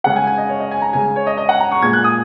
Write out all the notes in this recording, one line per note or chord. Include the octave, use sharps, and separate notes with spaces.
C#3 G#3 F#5
G#5
G#5
D#5
C#5
D#5
G#5
A#5
C#3 G#3 G#5
C#5
D#5
D#5
F#5
A#5
C#6
A#2 G#3 G#6
F#6
D#6